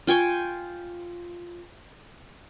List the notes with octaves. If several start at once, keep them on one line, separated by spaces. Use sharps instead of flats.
F4 G5 G#5 C#6